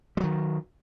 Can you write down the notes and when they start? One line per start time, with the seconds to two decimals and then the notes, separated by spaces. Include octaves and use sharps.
0.17 G3
0.20 F#3
0.24 D#3